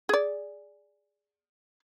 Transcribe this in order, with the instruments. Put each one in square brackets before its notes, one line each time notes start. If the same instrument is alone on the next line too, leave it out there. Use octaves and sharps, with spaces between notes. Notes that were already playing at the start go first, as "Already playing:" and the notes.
[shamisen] G#4 D5